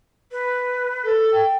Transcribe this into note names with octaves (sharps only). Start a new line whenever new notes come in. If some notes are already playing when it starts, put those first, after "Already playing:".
B4
A4
G5